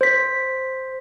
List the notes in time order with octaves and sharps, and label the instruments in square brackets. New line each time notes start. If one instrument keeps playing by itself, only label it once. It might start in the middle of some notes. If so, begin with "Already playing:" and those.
[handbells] C5 B6